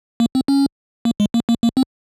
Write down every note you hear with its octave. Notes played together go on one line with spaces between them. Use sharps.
A#3
C4
C#4
A#3
G#3
A#3
A#3
A#3
C4